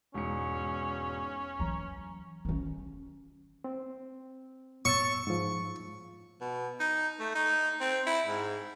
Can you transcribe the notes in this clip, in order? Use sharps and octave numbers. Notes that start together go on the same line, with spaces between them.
E1 G#2 C#4 C#7
E3 F#3 A#5
D#3 C#4
C4
C#5 C#6 E6 A6
G#2 F3
B2
D#4
A3
D#4
C4
E4
G#2